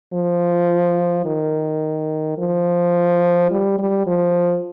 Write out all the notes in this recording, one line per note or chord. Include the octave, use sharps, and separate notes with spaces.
F3
D#3
F3
G3
G3
F3